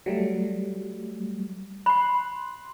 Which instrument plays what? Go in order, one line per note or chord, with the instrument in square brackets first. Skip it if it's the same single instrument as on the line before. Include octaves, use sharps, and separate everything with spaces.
[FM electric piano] F#3 G3 A3
[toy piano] B5 [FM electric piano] C6 F#6